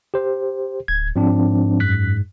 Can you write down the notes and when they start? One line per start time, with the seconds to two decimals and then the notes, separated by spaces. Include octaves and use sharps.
0.14 G4 C5
0.88 D1 G#6
1.16 G#2 F3 C4 D4
1.80 F#2 F#6 B6